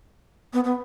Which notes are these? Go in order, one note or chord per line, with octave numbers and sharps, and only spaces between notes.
B3
B3